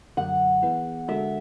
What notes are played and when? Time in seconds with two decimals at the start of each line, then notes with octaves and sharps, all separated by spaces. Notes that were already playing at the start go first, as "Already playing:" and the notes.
0.17 F#2 D3 F#3 F#5
0.62 E3 B3 E4 G#4 B4
1.08 D3 G#3 D4 F#4 A4 E5